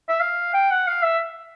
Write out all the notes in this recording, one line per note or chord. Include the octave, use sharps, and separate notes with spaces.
E5
F5
G5
F#5
F5
E5